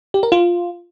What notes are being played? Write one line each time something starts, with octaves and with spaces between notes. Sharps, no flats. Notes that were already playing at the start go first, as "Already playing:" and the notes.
G4
A#4
F4